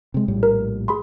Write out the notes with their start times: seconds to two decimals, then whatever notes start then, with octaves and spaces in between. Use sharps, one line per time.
0.14 C3 G#3
0.28 A#1 A2 G3
0.43 A#4
0.88 G#4 B5 C6